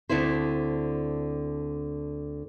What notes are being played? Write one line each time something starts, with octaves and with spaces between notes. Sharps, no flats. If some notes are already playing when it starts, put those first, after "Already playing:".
D2 D3 C4 E4 C5